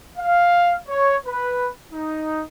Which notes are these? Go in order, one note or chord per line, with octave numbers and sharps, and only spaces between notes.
F5
C#5
B4
D#4